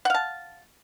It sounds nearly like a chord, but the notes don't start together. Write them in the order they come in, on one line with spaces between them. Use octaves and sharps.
F#5 F5 A5